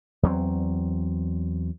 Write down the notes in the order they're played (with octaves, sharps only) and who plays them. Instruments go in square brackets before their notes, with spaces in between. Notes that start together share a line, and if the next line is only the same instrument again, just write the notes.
[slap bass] E2 F#3 C4